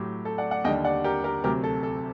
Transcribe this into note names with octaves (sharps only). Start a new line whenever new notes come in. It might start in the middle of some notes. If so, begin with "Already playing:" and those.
Already playing: A2 F#3 G4
A4
D5 F#5
D5 F#5
D#2 D3 G3 D#5 G5
D5 F#5
G4 A#4
G4 A#4
D2 C3 F#3 G4 A#4
A4
A4